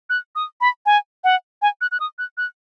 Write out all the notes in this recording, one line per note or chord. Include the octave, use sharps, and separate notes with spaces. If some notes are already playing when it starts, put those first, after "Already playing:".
F#6
D#6
B5
G#5
F#5
G#5
F#6
F#6
D#6
F#6
F#6